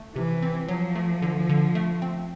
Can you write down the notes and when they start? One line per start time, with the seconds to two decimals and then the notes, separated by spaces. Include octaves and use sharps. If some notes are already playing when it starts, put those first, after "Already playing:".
Already playing: A3
0.15 C3 E3
0.42 C4
0.69 F3 F#3
0.95 A3
1.22 D3
1.49 D3
1.75 A3
2.02 C4